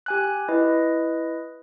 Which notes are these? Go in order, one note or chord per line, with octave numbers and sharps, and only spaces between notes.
G4 G#5 F#6
E4 B4 D#5